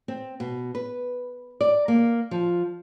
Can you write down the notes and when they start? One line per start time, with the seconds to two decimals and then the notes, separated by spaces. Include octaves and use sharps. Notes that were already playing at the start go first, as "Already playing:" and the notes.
0.08 C4
0.40 B2
0.75 B4
1.61 D5
1.88 A#3
2.31 F3